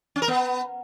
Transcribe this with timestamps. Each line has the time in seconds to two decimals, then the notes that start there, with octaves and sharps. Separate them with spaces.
0.16 C#4
0.22 A#4
0.28 B3